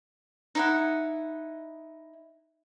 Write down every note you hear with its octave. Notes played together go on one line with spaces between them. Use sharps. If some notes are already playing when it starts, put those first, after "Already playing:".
D#4 E4 F#5